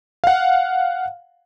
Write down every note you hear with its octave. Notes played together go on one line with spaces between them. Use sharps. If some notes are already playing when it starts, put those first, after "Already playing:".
F5 F#5